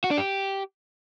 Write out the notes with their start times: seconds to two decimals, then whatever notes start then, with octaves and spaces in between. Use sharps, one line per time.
0.04 F#4
0.11 D4
0.18 G4